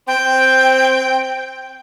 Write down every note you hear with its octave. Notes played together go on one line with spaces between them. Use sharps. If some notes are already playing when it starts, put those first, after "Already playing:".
C4 G5